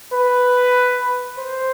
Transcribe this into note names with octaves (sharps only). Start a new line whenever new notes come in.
B4
C5